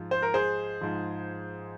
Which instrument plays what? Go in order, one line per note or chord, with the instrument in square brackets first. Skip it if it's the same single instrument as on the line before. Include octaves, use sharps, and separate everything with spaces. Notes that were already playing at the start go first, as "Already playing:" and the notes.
Already playing: [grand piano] G#2 F3
C5
A#4
G#4 C5
G#2 F3